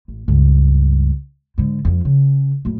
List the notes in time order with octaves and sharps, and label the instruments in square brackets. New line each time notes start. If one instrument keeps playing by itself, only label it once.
[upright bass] A1
C#2 G2
G#2 D3
F2 F3
C#3
F#2 A2